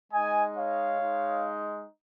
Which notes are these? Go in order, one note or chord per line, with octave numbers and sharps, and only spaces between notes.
G#3 D#4 D#5 G#5
C#5 F5
G#3 D#4